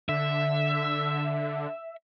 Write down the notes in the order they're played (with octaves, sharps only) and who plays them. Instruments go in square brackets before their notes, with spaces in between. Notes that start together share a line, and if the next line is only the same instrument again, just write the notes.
[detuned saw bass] D3 [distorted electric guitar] E5